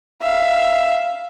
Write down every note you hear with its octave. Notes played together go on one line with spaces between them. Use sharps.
E5 F5